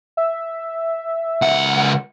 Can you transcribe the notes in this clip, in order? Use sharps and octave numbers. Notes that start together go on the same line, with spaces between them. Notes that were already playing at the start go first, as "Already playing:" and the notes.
E5
C#2 F#5